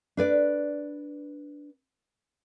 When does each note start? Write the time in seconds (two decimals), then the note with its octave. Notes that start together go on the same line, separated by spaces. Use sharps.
0.17 D4 B4 D5